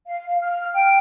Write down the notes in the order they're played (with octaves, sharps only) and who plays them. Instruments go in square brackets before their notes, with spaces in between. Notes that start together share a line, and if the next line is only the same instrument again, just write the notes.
[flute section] F5
F6
G5